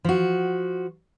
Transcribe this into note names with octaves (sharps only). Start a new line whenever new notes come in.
F3 F#4